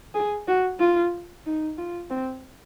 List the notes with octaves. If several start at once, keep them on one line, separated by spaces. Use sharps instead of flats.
G#4
F#4
F4
D#4
F4
C4